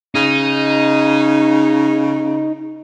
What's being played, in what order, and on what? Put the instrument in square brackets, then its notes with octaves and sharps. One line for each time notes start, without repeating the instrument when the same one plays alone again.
[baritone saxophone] C#3 [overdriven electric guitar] D#4